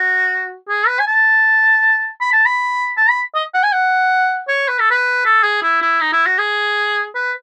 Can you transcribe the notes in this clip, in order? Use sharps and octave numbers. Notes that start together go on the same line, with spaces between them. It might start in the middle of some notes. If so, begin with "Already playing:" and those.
Already playing: F#4
G#4
B4
G#5
A5
B5
A5
B5
A5
B5
D#5
F#5
G#5
F#5
C#5
B4
A4
B4
A4
G#4
E4
E4
D#4
E4
F#4
G#4
B4